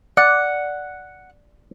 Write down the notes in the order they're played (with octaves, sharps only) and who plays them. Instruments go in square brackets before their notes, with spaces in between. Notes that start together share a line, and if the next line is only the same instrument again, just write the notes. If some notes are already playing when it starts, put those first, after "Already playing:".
[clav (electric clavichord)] D5 [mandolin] F#5